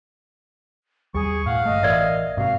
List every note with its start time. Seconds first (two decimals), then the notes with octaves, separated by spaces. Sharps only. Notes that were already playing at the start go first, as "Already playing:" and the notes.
1.14 D#2 G3 G#4 C#6
1.46 A2 F5 F#5
1.66 G1 A3 D#5
1.83 A1 A#4 D5 E5
2.37 G#2 C3 F#4 F5